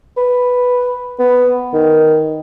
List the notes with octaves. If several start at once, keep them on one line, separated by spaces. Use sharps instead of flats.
B4
B3
D#3